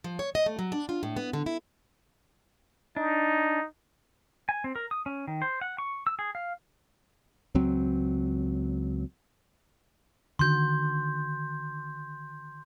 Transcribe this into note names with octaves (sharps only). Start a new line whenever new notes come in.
F3
C#5
D#5
A3
F#3
D4
F4
A2
B3
D3
E4
D4 D#4
G#5
C4
A#4
D#6
C#4
D#3
C5
F#5
C#6
E6
G#4
F5
C#2 F#3 C4
D3 D#3 F#4 C6 G6